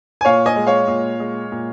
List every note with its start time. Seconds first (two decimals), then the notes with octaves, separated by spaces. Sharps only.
0.21 G#5
0.25 A#2 C#5 F5
0.46 D#5 G#5
0.56 G#3
0.67 C#5 F5
0.88 A#2
1.20 G#3
1.52 A#2